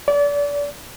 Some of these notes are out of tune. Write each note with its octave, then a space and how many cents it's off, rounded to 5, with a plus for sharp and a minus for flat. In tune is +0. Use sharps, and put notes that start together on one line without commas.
D5 -30